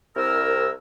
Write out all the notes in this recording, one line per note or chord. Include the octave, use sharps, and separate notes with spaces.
C2 A#4 E6